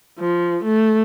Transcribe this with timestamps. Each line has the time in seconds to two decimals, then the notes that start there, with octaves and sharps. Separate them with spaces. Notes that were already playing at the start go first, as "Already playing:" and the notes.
0.19 F3
0.64 A3